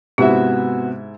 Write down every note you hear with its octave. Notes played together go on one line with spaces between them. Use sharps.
G#2 C3 B3 E4 F#4 G4 E5